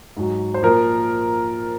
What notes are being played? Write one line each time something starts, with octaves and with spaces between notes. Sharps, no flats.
G#2 F#3
C5
A#2 F3 A#4